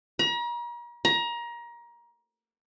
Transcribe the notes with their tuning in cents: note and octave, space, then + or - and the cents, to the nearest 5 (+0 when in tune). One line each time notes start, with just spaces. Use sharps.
A#5 +40
A#5 +25